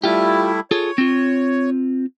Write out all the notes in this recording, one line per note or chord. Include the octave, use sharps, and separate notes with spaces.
G3 A3 E4 F4 G4
F4 G#4 A4 C#5
C4 F4